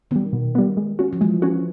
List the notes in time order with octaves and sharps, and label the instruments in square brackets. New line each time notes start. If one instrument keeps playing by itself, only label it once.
[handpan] D#3 [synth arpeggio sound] G3 B3
[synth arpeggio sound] B2
G3 B3
G#3
C#4 F#4
[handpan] F3
[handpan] E3 [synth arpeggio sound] G#3
[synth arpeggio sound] C#4 F#4